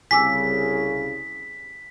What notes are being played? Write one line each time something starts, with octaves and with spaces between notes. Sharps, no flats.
C2 C#3 G#5 D6 E6 B6